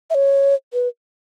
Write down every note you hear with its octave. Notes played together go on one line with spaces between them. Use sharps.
E5
C#5
B4